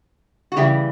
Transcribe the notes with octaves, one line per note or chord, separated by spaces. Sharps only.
F#4
C#3 E3 G3 E4 G4